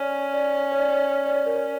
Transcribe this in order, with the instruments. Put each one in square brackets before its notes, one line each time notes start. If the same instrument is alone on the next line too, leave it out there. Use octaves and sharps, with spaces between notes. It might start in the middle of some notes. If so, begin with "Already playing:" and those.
Already playing: [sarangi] C#4 [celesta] D5
[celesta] D5
C#5
D5
D5
C#5
A#4
C#5